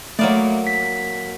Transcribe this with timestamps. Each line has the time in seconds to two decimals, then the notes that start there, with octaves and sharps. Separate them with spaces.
0.19 F#3 A3 A#3 D5
0.67 B6